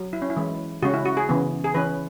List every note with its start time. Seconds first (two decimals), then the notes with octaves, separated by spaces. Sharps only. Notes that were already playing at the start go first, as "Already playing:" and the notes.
Already playing: F#3
0.13 E4
0.22 C#4
0.30 E4
0.37 E3 G#3 C#4
0.83 C#3 G#3 C#4 F#4
0.94 E4
1.06 F#4
1.17 G#4
1.29 C#3 E3 B3
1.64 G#4
1.74 E3 C#4 B4